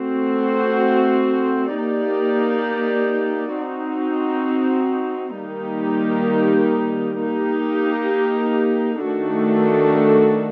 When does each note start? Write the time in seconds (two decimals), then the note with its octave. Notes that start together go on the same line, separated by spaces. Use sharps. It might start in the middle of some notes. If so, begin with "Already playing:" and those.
Already playing: A3 C4 F#4 C5
1.74 A#3 D#4 G4 D5
3.56 C4 D#4 F#4
5.37 D#3 G3 A#3 D#4 G4
7.20 A#3 D#4 G4
9.02 D#3 A3 D4 F#4 A4